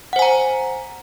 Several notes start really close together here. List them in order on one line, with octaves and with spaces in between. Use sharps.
F#5 C5 G#5 A#5